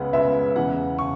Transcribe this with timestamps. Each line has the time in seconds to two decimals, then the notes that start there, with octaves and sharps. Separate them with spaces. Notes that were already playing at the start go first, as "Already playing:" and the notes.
Already playing: C#2 C#3 G#3 B3 F#5
0.13 C#2 C#3 G#3 B3 E5
0.56 E2 C#3 E3 F#5
0.99 C#3 C#6